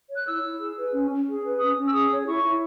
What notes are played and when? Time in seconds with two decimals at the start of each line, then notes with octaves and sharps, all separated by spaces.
0.09 C#5
0.17 F#6
0.26 E4 E6
0.43 E4
0.59 G#4
0.76 B4
0.93 C#4
1.09 C#4
1.27 G#4
1.44 B4
1.60 C#4 D#6
1.76 C#4
1.87 E6
1.93 G#4 D#6
2.10 C#5
2.26 E4 C#6
2.44 E4